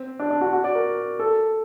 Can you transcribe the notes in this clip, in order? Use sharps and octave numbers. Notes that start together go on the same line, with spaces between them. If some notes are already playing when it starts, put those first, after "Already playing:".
Already playing: C4
D4
D4
F#4
F#4
D5
A#4
A4